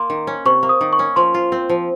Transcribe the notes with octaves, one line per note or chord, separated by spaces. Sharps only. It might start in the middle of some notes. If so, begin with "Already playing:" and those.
Already playing: A#3 C6
D#3
C#4
C3 C#6
A#3
D#6
D#3
C#6
C#4
F3 C6
F4
C4
F3